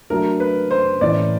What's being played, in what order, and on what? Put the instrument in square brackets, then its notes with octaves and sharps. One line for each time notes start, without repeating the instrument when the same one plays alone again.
[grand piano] F#3 A3 D4 [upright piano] A#4
[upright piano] B4
C5
[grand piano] A2 E3 A3 C#4 [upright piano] D5